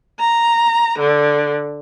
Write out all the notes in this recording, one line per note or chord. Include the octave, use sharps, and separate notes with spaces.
A#5
D3